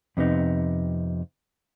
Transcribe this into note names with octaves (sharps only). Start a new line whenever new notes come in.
F2 C3 B3 D#4